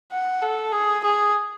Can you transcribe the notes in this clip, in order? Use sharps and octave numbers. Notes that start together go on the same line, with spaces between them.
F#5
A4
G#4
G#4